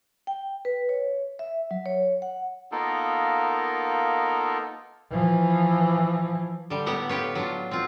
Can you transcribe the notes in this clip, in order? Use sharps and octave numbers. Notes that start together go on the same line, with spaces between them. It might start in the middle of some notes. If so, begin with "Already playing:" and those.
G5
B4
C#5
E5
F#3
C#5
F#5
A#3 B3 D#4 F4 A4 A#4
E3 F3
D3 G3
A2 B3 G4 F#5 A#5
F4 G4 B4 C#5
F#3 D4 F4
C4 F4